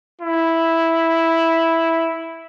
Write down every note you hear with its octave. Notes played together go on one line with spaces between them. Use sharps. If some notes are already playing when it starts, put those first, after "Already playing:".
E4